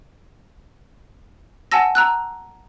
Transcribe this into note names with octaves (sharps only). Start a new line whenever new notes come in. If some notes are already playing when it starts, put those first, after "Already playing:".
F#5 G#5 A5 E6 A#6
A#5 E6 F#6